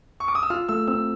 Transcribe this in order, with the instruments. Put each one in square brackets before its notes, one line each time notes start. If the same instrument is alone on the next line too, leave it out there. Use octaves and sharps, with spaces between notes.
[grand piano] C#6
D6
D#6
E6
[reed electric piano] F4 [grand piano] F6
[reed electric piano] A3 [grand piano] E6
[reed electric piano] C4 [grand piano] E6